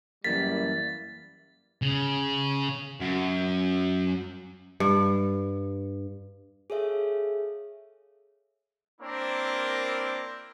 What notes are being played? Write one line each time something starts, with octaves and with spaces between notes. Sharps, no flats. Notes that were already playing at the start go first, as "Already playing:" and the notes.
F#2 E3 G3 A#3 A6 B6
C#3
F#2
G2
G#4 A4 C#5 E5 F5
A#3 C4 D4 E4 A#4 C5